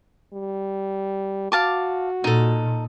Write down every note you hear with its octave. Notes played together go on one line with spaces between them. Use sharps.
G3
F#4 F5 A5 D6
A#2 D#4 A4